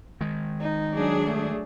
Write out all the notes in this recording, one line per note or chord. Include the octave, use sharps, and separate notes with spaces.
D#3 G#3
D#4
F#3 D4 G#4
A3